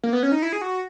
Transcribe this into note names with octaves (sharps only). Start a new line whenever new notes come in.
A#3
B3
C#4
D#4
E4
G#4
F#4